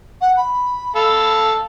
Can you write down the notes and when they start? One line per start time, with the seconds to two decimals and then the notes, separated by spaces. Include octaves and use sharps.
0.21 F#5
0.37 B5
0.96 A4 F5 A5